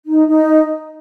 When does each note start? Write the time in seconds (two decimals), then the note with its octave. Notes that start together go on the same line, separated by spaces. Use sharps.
0.05 D#4
0.27 D#4